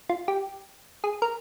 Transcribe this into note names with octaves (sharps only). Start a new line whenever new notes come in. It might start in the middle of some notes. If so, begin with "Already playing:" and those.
F4
G4
G#4
A#4